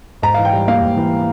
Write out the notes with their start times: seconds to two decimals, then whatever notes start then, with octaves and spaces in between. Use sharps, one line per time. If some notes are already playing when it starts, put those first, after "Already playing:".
0.22 G#2 A#5
0.34 E3 F5
0.45 G5
0.53 G3
0.68 A#3 F5
0.82 G#2
0.96 E3